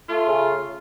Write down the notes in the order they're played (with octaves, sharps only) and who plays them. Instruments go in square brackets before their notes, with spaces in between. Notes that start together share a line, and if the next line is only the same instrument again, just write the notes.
[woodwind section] A3 [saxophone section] F4
[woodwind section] C#3